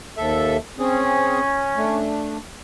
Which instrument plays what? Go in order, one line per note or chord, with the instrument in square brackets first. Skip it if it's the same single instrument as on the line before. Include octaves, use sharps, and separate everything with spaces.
[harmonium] D#2 A4 E5
[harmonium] C4 G#4 [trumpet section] C#4
[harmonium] A3 D4